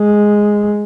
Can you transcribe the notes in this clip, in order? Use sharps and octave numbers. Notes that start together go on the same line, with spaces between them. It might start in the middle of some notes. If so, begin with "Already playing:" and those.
Already playing: G#3